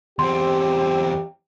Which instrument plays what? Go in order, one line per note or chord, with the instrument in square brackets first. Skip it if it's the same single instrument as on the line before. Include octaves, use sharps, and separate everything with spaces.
[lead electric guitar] E2 C4 [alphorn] G4 [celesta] C6